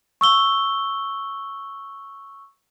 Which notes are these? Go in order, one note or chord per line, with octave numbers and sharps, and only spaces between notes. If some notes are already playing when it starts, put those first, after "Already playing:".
C#6 E6 G7